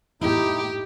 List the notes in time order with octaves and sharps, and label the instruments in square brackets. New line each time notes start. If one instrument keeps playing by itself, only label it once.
[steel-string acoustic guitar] A2 E4 [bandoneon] D#4 [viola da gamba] G4